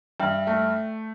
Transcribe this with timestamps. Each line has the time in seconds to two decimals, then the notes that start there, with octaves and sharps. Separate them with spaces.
0.20 G2 E5 G5
0.47 A3